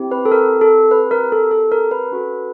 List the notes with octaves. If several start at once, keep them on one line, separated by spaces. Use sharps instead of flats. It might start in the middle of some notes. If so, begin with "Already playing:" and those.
Already playing: C4 E4 G4
B4
A4
A#4
A4
B4
A#4
A4
A4
A#4
B4
C#4 F#4 A4